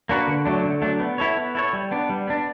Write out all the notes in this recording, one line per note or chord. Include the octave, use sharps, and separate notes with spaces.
A#3 D4 F#4 B4
D3
F#3 A3 D4
D3
F#3 A3 D4
B3
E4 A4 C#5
B3
E4 A4 C#5
G3
B3 D4
G3
B3 D4